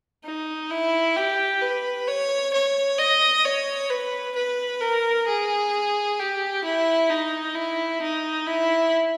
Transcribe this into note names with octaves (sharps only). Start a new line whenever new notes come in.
D#4
E4
G4
B4
C#5
C#5
D#5
C#5
B4
B4
A#4
G#4
G4
E4
D#4
E4
D#4
E4